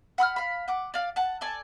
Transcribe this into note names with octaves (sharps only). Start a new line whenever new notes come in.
F#5 B5 E6 F6
F5 B5
F#5 D6
D5 F5
F#5 A5
A4 D5 G#5 A5